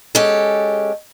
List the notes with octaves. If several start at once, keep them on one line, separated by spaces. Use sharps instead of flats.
G#3 C#4 G4 A4